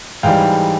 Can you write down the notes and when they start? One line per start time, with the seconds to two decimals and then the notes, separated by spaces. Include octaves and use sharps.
0.23 G#2 E3 G3 F5 G5